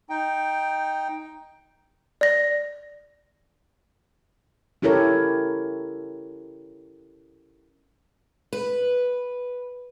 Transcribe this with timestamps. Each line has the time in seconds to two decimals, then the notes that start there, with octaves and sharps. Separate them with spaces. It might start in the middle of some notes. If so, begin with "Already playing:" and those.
0.09 D#4 G5
2.21 D5 A#6
4.82 C#4 E4 G4 A4 A#4 C#5
8.53 B4